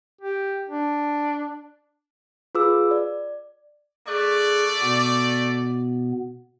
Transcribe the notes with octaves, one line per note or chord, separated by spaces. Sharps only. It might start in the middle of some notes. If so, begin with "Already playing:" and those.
G4
D4
F4 G#4 B4 D6 E6
D5
A3 G#4 D5 C#6 F#6
B2 B3